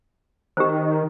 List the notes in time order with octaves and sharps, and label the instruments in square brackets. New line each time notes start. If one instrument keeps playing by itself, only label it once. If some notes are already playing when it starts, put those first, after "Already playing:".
[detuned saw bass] D#3 [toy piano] G4 C5